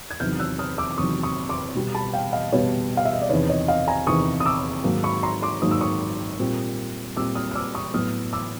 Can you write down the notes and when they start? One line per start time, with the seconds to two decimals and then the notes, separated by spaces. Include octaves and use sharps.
0.11 G#6
0.20 E2 C3 D#3 F#3 F6 G6
0.39 E6 F#6
0.59 D#6 F6
0.78 D6 E6
0.91 D6
0.98 E2 C3 D#3 F#3 C#6 D#6
1.23 C#6 D#6
1.49 C6 D6
1.75 B2 G3 B3
1.95 A5 B5
2.14 F5 G5
2.33 D#5 F5
2.52 B2 G3 B3 B4 C#5
2.97 F5
3.05 E5
3.13 D#5
3.21 D5
3.29 E2 C3 D#3 B4 C#5
3.49 C#5 D#5
3.68 D#5 F5
3.88 G#5 A#5
4.07 E2 C3 D#3 C#6 D#6
4.40 D#6
4.46 D6 E6
4.84 G#2 D#3 F#3 A#3
5.03 B5 C#6
5.23 A#5 C6
5.42 C6 D6
5.62 G#2 D#3 F#3 A#3 D#6
5.71 E6
5.81 C#6 D#6
6.39 A#2 G3 C4
7.17 A#2 G3 C4 D6 E6
7.35 D#6 F6
7.51 F6
7.55 D6 E6
7.75 C#6 D#6
7.94 A2 F#3 B3 D#6 F6
8.33 D6 E6